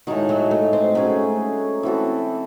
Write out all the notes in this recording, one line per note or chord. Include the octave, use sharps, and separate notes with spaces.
A2 D#3 G#3 D#4 F#4
F#3
A3
C4
F#3 A3 C#4 G#4
E3 C4 F#4 A4